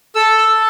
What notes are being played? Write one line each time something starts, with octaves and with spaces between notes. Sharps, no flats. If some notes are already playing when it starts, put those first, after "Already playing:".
A4 E6
E6